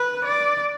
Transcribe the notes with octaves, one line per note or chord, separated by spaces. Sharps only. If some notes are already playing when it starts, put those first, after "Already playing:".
Already playing: B4
D5